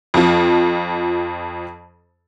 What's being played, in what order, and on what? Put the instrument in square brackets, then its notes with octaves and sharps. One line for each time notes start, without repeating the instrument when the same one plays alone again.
[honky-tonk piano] F2 F3